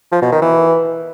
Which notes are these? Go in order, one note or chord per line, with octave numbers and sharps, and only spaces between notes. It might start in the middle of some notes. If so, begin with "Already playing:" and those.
F3
B2
D#3
E3